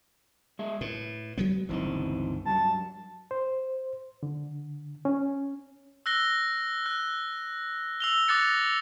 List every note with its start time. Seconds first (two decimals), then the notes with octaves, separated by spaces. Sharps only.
0.59 G#3 G#4 E5
0.81 A2 B4
1.38 F#3 G#3 B3
1.69 G1 C#2 D#3 E3 C4 D#4
2.45 G2 F#3 A5
3.31 C5
4.23 D3
5.05 C#4
6.06 E6 F#6 A#6 G7
6.86 F#6
8.00 E6 F7 G7
8.28 D6 D#6 F#6 A6 A#6 C#7